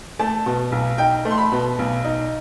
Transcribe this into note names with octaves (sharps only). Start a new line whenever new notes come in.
A3 A5
B2
B1
D#4 G5
A3
C6
B5
B2
B1
D#4